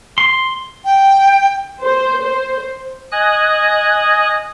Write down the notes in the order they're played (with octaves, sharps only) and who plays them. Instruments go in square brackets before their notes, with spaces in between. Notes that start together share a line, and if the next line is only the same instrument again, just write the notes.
[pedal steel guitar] C6
[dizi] G5
[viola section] C5
C5
[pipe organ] D#5 G#5 D#6 F#6